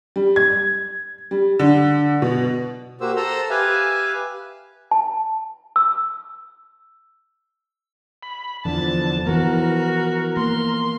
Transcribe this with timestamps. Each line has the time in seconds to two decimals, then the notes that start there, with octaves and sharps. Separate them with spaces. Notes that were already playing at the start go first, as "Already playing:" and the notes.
0.16 G3
0.36 G#6
1.31 G3
1.59 D3
2.22 B2
3.01 A#3 F#4 G4 C5 E6
3.16 A4 C5 A#5 C6 E6
3.50 G4 B4 E5 F5 G#5
4.91 A5
5.76 E6
8.23 B5
8.65 E2 D3 F3 A5
9.27 E3 B3 F#4 A#4
10.37 A#3 C6